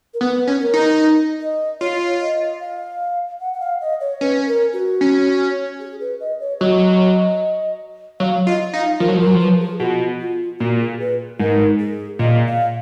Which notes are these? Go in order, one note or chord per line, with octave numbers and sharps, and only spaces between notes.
A#4
B3 B4
C#4
A#4
D#4
D#5
F4 C#5
D#5
F5
F#5
F#5
F5
D#5
C#5
C#4 B4
A#4
F#4
C#4
G#4
B4
D#5
C#5
F#3 D#5
F#3 F5
F4 D#5
D#4 F5
F3 A#4
F#3
F3 A#4
F#3
F3 B4
G#4
B2 F4
F4
A#2 F#4
G#4
B4
G#2 A#4
G#4
A#2 D#5
F5